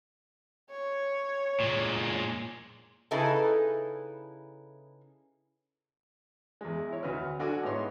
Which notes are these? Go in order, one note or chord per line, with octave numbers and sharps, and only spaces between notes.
C#5
A#2 G#3
C#3 D#4 E4 G#4 A4 B4
E2 G#3
E4 C#5
D2 F#4 B4 F6
D4 F#4 A4 D5 G#5
G#2 G#3 B3 E4 C#5 C6